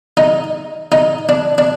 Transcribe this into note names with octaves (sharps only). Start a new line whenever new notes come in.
D#4
D#4
D4
D4